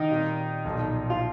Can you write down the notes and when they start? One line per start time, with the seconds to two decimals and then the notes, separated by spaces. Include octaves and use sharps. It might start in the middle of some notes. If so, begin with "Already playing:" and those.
Already playing: D#3 D#4
0.10 A#2 G3 C4
0.65 B1 A#2 F3
1.10 F4